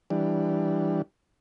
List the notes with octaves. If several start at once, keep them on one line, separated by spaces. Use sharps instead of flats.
E3 G3 D4